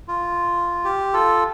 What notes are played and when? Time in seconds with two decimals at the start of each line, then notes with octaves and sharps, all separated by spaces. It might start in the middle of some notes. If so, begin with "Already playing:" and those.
0.08 F4
0.84 G4
1.13 F4 A4